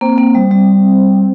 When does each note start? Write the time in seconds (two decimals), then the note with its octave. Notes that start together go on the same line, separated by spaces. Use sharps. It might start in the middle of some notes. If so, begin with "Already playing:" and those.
0.01 A#3 C4
0.18 A#3
0.35 G3
0.51 G3